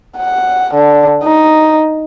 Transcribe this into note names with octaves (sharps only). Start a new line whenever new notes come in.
F#5
D3
D#4